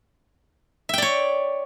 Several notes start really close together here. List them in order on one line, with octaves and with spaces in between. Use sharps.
E5 G5 D5 C#5